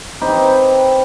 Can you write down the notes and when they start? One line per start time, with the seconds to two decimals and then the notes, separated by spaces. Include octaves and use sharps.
0.21 C4 D#4 G4 B4